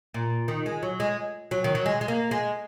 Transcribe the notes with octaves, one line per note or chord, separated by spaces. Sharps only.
A#2
D#3
G#3
F#3
G#3
F#3
D#3
F#3
G#3
G#3
A#3
G#3